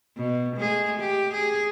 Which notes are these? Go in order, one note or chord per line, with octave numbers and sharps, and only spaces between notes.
B2
G#3 A3 G#4
G4
G#4